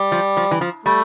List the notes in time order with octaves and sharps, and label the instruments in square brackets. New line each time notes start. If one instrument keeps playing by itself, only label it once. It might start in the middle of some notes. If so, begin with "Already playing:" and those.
Already playing: [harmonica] G3
[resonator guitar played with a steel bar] F3
F3
E3
F3
[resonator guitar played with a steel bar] G3 [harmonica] A3